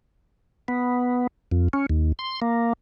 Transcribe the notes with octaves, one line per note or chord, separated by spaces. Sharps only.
B3
F2
C#4
D#2
C6
A#3